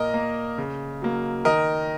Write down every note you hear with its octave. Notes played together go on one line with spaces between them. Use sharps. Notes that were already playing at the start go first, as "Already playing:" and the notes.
Already playing: A#2 A#4 D#5
A#3
C#3
F#3 A#3
D#3 A#4 D#5